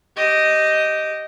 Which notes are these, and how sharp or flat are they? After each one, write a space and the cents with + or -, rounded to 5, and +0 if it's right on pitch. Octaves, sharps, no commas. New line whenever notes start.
G4 -15 D#5 +0